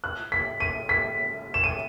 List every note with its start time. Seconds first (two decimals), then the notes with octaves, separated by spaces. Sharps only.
0.04 F#6
0.32 B6
0.60 D#7
0.89 B6
1.54 E7
1.64 D#7